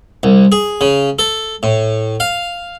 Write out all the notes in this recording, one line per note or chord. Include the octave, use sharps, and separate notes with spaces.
C2
G#4
C#3
A4
A2
F5